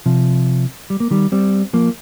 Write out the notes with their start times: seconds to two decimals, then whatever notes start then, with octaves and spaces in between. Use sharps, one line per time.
0.06 C3 F3
0.90 G3
1.00 A#3
1.11 D#3 G3
1.32 G3 C4
1.73 F3 A#3